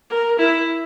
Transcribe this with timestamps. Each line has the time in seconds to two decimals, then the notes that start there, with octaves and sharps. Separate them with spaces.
0.10 A#4
0.39 E4